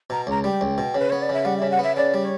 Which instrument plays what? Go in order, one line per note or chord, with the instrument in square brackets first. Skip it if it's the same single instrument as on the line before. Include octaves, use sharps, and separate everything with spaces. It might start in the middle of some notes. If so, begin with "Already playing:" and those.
[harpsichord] B2 [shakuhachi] A#5
[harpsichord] C#2 [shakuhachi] A#5
[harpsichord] G3 [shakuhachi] G5
[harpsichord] C#2
B2
[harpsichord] C#3 [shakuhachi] B4
[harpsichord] B3 [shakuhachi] C#5
[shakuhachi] D5
[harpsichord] C#3 [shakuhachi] E5
[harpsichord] G3 [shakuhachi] F#5
[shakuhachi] E5
[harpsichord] C#3
[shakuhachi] F#5
[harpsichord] B3 [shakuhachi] E5
[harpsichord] C#3 [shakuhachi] D5
[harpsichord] G3
[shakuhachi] C#5